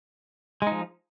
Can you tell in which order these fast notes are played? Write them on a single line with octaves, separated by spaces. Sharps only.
G#3 D#4 F3